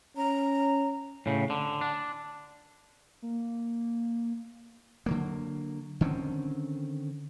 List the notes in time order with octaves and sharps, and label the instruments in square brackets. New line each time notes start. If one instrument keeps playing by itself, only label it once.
[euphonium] C#4 [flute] A#5
[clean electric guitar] A2 C#3
D3
D4
[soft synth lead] A#3
[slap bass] D3 F#3 A#3
D3 D#3 C4 C#4